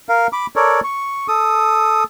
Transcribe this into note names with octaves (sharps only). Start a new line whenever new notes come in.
A#4 F5
B5 D6
A4 A#4 C#5 D5
C#6
A4 D#6